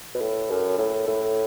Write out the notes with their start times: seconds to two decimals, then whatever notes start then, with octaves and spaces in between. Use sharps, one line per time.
0.15 B2
0.21 A2
0.50 F#2
0.78 A2
1.08 A2